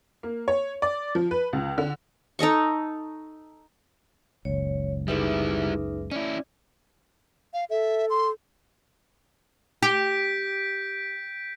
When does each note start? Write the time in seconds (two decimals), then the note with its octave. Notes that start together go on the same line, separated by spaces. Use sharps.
0.23 A#3
0.48 C#5
0.82 D5
1.15 F3
1.31 B4
1.53 C#2
1.78 D3
2.39 D#4 A4 D#5 C#6
4.45 F#1 C#2 C#5
5.08 G3 D#4 E4 G#4 B4 E5
6.12 C#4 E4 D5
7.54 F5
7.70 A4 E5
8.10 C6
9.82 G4 G6 B6 D7